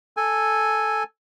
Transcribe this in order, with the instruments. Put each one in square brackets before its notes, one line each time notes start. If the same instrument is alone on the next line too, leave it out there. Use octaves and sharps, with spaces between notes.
[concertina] A4 G#5